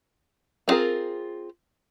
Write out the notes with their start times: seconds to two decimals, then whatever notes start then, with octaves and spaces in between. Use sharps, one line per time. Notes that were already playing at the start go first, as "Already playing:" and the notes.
0.68 B3 C4 F4 G#4 A#4